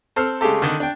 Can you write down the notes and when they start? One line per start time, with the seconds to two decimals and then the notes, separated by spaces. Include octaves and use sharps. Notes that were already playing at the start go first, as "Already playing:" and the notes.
0.16 C4 A4 C5 F6
0.41 C#3 G#3 A3 G4 A4
0.62 D3 D#3
0.80 D4 G5